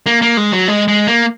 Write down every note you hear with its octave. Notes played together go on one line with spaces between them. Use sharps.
A#3
A#3
G#3
F#3
G#3
G#3
A#3